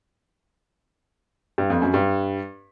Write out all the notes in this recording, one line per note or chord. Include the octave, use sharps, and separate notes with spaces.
G2
F2
F#2
G2